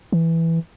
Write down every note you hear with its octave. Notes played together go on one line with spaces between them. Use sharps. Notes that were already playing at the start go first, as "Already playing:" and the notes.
E3